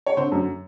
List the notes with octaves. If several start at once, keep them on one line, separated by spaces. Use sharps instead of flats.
C#5
D3 C4 C5
F#2